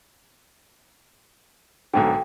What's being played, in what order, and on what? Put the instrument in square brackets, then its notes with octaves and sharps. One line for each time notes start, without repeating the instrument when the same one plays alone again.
[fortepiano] B1 G#2 D3 [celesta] G5